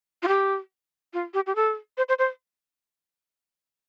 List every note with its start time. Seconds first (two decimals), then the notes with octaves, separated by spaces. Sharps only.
0.23 F4
0.28 G4
1.13 F4
1.34 G4
1.47 G4
1.56 A4
1.98 C5
2.09 C5
2.19 C5